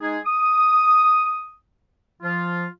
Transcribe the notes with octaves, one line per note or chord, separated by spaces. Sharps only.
G#3 D#4 G#4
D#6
F3 F4